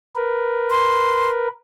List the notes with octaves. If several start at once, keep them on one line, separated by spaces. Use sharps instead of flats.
A#4 B4
C6